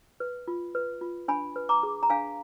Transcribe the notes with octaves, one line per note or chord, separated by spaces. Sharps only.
B4
F4
B4
F4
D4 G#5 B5
B4
A#5 D6
G#4
A#5
D4 F5 G#5